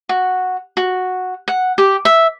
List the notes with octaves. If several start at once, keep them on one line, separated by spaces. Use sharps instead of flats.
F#4
F#4
F#5
G4
E5